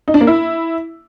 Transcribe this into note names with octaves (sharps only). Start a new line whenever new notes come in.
D#4
D4
A#3
E4